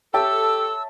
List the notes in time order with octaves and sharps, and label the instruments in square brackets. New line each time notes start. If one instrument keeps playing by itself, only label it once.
[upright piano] G4 G5 [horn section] A4 [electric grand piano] C#5 E5 A5 [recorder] E6